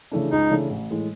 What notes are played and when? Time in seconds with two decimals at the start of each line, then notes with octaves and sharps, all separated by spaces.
0.11 C#3 E3 A3 D4
0.31 C#2 D#4
0.51 C#3 E3 A3 D4
0.70 A1
0.91 A2 E3 G#3